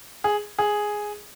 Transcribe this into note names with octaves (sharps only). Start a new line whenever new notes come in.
G#4
G#4